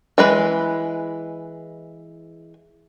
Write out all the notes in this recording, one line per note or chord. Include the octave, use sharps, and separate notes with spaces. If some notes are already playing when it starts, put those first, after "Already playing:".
E3 G#3 B4